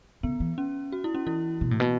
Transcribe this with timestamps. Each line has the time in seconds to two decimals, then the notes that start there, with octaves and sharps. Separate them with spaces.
0.23 C#3 B3
0.40 E3
0.58 C#4
0.92 F#4
1.04 E4
1.14 C#4
1.27 E3 E4
1.61 B2
1.71 A2
1.80 B2